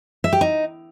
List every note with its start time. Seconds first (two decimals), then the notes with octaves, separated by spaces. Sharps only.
0.24 E5
0.33 G4
0.41 D#4